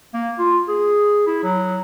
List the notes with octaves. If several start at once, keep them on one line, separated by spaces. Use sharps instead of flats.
A#3
F4
G#4
E4
F#3